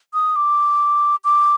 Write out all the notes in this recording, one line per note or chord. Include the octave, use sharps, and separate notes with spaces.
D#6
D6
D6